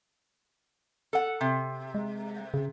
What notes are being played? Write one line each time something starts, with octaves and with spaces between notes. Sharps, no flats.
A4 F#5
C3
G#3
C#3